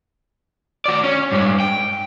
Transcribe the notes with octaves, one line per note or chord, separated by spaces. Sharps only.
F#4 D5
C#4
G2 G#3
G5